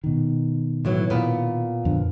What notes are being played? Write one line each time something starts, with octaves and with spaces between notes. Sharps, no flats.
B2 D#3
A2 E3 F#3
A#2 B3
F2 D3